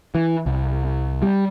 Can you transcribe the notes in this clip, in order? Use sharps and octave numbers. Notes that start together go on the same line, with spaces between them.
E3
C2
G3